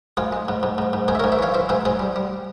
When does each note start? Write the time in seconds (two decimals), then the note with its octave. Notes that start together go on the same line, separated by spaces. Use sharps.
0.17 G#2 F4 G#4
0.32 G#3
0.48 G#2
0.63 G#2
0.78 G#2
0.93 G#2
1.08 G#2 G#4 C5
1.15 E5
1.20 A#4 C#5
1.24 G#2
1.32 C5 E5
1.39 E3 C#5 F5
1.54 E3 C5 E5
1.69 G#2 G#4 C5
1.85 G#2 G#4 C5
1.99 G3
2.16 G3